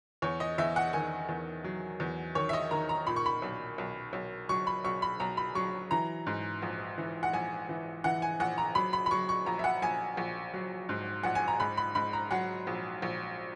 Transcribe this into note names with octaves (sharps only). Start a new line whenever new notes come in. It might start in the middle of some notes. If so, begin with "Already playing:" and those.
E2 C#5
D#5
E2 E5
F#5
D#3 G#5
E2
F#3
E2
D#3 C#5
E5
D#5
D#3 A#5
A#5
A#2 B5
C#6
B5
B1
B1
B1
F#3 C#6
B5
B1 C#6
B5
B1 A#5
B5
F#3 C#6
E3 A#5
G#2
A#1
E3
F#5
A#1 G#5
E3
E3 F#5
G#5
A#1 F#5
A#5
F#3 B5
B5
B5
F#3 C#6
C#6
A#1 A#5
E5
F#5
A#1 G#5
A#1
F#3
G#2
A#1 F#5
G#5
A#5
G#2 B5
B5
G#2 B5
A#5
F#3 F#5
A#1
A#1